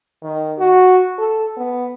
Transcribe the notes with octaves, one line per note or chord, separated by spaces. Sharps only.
D#3
F#4
A4
B3